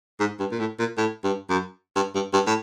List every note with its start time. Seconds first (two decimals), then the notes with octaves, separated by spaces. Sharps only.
0.20 G#2
0.40 G2
0.52 A#2
0.59 A2
0.79 A#2
0.97 A2
1.24 G2
1.50 F#2
1.95 G2
2.15 G2
2.33 G2
2.47 A2